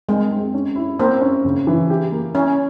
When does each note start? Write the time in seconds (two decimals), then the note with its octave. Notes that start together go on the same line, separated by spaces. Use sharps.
0.08 G#3 C4
0.31 C4
0.54 C#4
0.76 E4
0.99 A#3 C4
1.21 C#4
1.45 C#3
1.67 E3
1.90 G4
2.12 A#3
2.34 C#4 E4